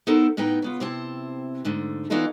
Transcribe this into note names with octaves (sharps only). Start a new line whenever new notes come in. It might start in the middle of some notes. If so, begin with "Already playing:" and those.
B3 D#4 E4 A4 A#4 C5
A2 B3 D#4 B4 G5
C#3 B3 F4
C3 C4 E4 C5 A5
G#2 D3 A3
E3 B3 D4 D#4 F4 A4